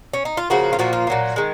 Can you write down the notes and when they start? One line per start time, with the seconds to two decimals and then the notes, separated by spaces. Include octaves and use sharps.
0.13 C#4
0.25 D#4
0.37 F4
0.50 C#3 F3 A#3 F#4
0.73 F4
0.79 A#2 F3 A#3 F#4
0.93 F4
1.07 A#2 F#3 A#3
1.36 D#3 G#3